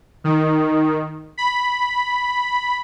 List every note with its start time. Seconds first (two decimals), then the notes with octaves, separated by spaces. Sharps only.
0.24 D#3
1.38 B5